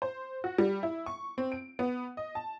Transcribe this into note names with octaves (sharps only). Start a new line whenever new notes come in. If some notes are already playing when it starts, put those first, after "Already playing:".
C5
F#4
G3
E4
C#6
C4
D7
B3
D#5
A5